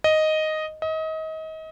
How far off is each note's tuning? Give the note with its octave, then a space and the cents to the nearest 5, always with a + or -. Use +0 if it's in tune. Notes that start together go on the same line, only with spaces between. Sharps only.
D#5 +0
D#5 +30